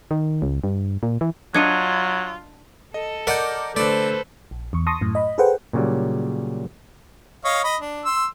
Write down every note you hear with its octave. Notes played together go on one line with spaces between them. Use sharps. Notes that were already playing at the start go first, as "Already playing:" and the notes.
D#3
C#2
G2
A#2
E3
F#3 D4 F4 D#5 G#6 C#7 D#7
A4 D#5
A#4 D5 D#5 F#5 D6 G6
D3 A3 A4 B4 C5 D5
A#1
E2 C#6
A5 C6 C#6 D#6 A#6
F#2 A2
D#5 B5
G#4 A4 B4 C5 F#5 G5
A#2 C#3 F#3 G3
C#5 D#5 F5
D#5 B5
D4
C6 E6